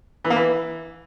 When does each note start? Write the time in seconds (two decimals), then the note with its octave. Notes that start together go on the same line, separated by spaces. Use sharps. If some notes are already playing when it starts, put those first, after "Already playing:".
0.25 E3
0.30 A#3
0.36 E3